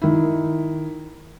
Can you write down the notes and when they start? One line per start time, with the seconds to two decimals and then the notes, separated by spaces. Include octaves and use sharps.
0.02 D#3 E4